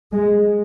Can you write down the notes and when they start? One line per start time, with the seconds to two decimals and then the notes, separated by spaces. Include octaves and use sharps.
0.12 G#3